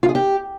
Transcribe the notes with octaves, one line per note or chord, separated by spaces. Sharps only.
F4
G#4
G4